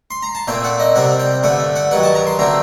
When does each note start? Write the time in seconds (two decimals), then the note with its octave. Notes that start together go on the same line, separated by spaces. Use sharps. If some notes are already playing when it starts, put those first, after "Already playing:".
0.11 C6
0.23 A#5
0.35 A5
0.48 A#2 A3 C4 G5
0.64 F#5
0.80 D#5
0.95 C3 G3 C4 F#5
1.20 G5
1.43 G2 D3 A3 F#5
1.76 F#5
1.91 G2 D#3 F#3 F#5
2.03 A5
2.15 A#5
2.27 C6
2.39 D3 A3 C4 A#5